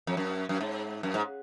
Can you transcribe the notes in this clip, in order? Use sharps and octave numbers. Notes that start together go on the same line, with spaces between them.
F2
F#2
F#2
G#2
F#2
G#2